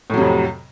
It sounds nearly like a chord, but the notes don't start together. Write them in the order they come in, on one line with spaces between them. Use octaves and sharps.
A2 F#3 C3 F2